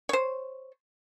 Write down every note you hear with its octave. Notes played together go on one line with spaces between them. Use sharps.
C5 C#5